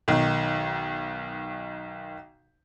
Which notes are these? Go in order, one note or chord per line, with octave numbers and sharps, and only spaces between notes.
B1 D#3